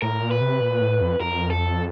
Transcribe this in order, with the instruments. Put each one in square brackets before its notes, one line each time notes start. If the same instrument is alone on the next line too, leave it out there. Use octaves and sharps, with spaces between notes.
[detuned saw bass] A2 [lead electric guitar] A#4
[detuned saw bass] A#2
[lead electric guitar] B4
[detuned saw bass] C3
A#2
A2
F2
[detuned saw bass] F2 [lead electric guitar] A#4
[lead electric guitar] A4